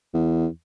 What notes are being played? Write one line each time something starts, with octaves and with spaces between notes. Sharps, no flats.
E2